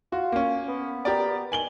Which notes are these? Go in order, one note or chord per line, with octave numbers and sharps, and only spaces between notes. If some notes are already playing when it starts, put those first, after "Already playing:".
F4 F#4
A#3 C#4
B3
G4 A#4 D5
B3
D#3 G#5 F#7 G7